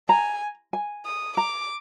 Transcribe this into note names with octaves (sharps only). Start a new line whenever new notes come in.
G#5 A#5
G#5
D#6
A#5 D6